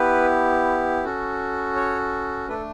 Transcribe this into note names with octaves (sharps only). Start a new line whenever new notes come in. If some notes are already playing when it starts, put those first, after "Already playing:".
Already playing: B3 E4 G4 B4
C#4 F#4 A4
C#5
A3 D4 A4 B4